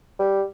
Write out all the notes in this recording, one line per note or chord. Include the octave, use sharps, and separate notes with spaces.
G3